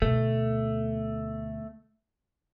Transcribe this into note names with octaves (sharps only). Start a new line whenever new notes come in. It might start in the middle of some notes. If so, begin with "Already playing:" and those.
D2 B2 A3